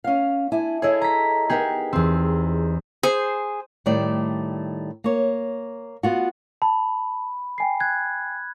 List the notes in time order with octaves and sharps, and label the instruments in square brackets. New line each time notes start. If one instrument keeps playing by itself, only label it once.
[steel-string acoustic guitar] C#4 F5
D4 E4 G#5
[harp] E4 G#4 [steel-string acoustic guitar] A4 C#5 D#5
[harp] A#5 B6
[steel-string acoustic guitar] B3 D#4 A#4 [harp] G4 G#4
[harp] E2 C4
[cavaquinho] G#4 [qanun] C5
[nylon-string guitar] A2 D#3 G3 A3 D5
A#3 C#5
B3 F4 F#4
[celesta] A5 [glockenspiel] B5
[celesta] G5 G#5 C7
[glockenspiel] F#6 G#6